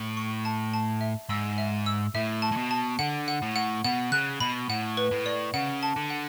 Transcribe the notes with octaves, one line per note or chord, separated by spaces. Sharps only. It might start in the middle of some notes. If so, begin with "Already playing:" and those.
Already playing: A2
C#6
A5
A5
E5
G#2 E6
E5
E6
A2 E5
A5
A2
B2
A5
D3 F#5
F#5
A2
F#5
B2 F#5
C#3 F#6
B2 B5
A2 F#5
B4
A2
D5
C#3 F#5
A5
D3
F#5